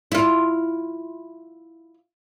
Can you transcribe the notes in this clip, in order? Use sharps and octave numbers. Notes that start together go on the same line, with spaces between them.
E4 F4